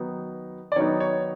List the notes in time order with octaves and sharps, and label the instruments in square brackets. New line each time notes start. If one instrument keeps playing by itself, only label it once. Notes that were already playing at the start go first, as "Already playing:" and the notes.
Already playing: [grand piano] D#3 F#3 B3 D#4
D5
D#3 F#3 B3 D#4 C#5
C#5